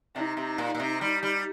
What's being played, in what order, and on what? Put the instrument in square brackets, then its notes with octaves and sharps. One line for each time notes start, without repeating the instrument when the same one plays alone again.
[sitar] C3 [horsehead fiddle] D#4
[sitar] C3
A#2
A#2
C3
G3
G3